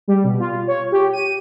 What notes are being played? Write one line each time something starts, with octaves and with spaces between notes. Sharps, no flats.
G3
B2
F4
C#5
G4
D#7